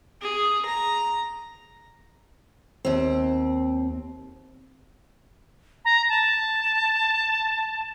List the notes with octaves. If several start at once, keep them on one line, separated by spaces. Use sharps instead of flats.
G#4
A#5
D#2 C4
A#5
A5